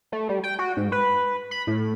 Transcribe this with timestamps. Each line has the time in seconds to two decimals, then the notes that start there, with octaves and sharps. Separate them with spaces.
0.12 A3
0.29 G3
0.43 G5
0.59 F#4
0.77 G#2
0.92 B4
1.51 B5
1.67 A2